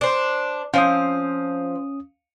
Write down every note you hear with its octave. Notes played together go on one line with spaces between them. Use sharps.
D4 C5
F3 C4 C#4 F5 D#6